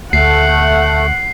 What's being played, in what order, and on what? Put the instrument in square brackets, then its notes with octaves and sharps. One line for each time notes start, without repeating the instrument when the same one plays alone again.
[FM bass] D2 [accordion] A3 [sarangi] F#5 [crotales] C7